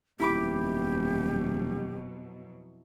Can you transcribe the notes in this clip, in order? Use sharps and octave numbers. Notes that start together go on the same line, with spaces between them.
D#1 F2 B2 F#3 E4 G4 B5 D6